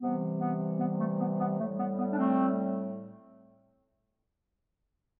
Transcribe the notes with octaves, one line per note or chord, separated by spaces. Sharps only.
C3 E3 G3 B3
B3
B3
A3
B3
B3
A2 G3 A3
B3
B3
D4
A3 C4